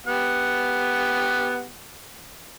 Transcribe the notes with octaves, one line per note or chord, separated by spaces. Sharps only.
B3 G4 F#5